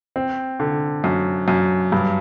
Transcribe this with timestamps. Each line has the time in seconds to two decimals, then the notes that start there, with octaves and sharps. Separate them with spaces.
0.16 C4
0.60 D3
1.04 F#2
1.48 F#2
1.92 G2